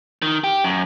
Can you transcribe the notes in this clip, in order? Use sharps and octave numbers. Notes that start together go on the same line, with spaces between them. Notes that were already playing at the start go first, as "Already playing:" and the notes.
D#3
G4
F#2